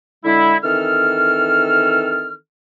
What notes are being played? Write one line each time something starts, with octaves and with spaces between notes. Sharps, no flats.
D3 G#3 E4
D#3 E3 C4 A4 F6